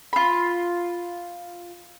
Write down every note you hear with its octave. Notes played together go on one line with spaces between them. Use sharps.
F4 B5